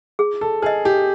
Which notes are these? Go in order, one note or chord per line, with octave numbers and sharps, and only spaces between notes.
G#4
A4
G#4 B4 D#5
G4